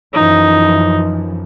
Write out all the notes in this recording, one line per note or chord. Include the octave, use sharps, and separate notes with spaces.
F#2 E3 F3 D#4